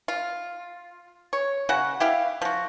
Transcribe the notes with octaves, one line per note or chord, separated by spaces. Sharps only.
F4
C#5
C#3 F#4 F#5
E4 G4 F5
F3 F#4